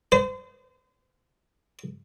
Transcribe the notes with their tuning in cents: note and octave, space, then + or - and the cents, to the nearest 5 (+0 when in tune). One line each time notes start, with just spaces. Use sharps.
C5 -35